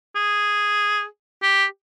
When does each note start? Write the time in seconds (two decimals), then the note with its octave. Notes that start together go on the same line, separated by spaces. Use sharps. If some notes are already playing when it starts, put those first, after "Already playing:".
0.15 G#4
1.42 G4